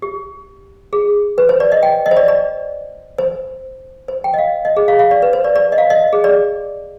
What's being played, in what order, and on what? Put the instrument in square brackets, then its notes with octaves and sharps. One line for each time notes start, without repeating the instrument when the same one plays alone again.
[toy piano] G4
G#4
B4
C5
D5
D#5
G5
D#5
C5
D5
D5
C5
C5
G5
D#5
F5
D#5
G#4
F5
F5
D5
B4
C5
D5
D5
D#5
F5
D#5
G#4
D5